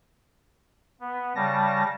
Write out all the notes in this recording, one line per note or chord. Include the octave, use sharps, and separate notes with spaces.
B3
C#3 G3 A5 A#6